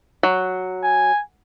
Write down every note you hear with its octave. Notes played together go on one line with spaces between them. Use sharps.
F#3
G#5